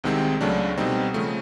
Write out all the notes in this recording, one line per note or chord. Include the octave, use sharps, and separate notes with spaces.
C2 C3 D#3 G#3 C4
C#2 C#3 F#3 A3 D4
B2 G3 C4 D#4
C#3 F3 A3